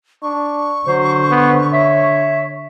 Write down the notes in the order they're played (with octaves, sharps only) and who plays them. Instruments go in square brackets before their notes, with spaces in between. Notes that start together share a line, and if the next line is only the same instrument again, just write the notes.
[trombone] D4 [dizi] C#6
[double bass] D3 [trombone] F#3 [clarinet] C5
[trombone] B3
[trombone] C#5 [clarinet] E5